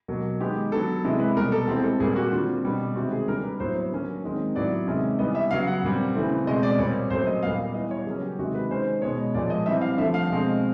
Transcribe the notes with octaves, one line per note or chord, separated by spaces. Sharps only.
B2 F#3 A#3
D#3 G#3 B3 G4
D3 F#3 B3 A4
C3 E3 G#3
B4
B2 G3 B3 A#4
A4
E3 G#3 C4 G4
A4
A#2 G3 A#3 G#4
F#4
D3 G3 C4 F4
B2 G3 B3
C3 D#3 G#3 C4 F#4
G#4
D3 G3 A#3 A#4
B4
A2 F#3 B3 C5
C#5
D3 F#3 A#3 C#4
D#3 G#3 C4
A2 F#3 B3 D5
C3 D#3 G#3 C#4
E3 G3 B3 D#5
E5
C#3 F#3 B3 F5
F#5
A#2 G3 C4
C#3 E3 A3 C4
B2 G#3 C4 D#5
D5
A#2 G3 C4 C#5
A#2 F#3 A3 C#4 C5
D#5
A#2 G3 B3 F5
E3 G3 B3 D#5
C#5
C#3 F#3 A#3 C#4 G#4
G4
C3 D#3 G#3 F#4
B4
D#3 G#3 C#4 C5
B2 G#3 B3 C#5
A#2 F3 G#3 D5
D#5
E3 G3 C4 E5
F5
D3 F3 A3 E5
F5
B2 G#3 C4